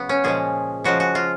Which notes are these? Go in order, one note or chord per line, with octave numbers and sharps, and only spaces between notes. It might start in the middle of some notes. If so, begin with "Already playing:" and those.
Already playing: C#3 F#3 B3
C#4
A#2 F3 G#3 G#4
C#3 F3 G#3 F#4
F#4
F4